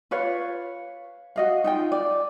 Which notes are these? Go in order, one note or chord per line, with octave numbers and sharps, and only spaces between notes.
F4 B4 C#5 F5
F#4 D#5 F5
D#4 F4 G5
D5